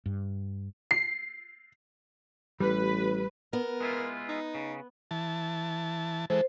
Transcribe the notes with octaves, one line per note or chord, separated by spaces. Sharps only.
G2
C7
A1 G3 B4
B3 A#4
G#3 E4 F4
D#4
C#3
E3 A5
E3 G#3 A4 C5